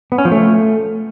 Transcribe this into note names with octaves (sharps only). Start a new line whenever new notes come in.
B3
C#4
F3
A3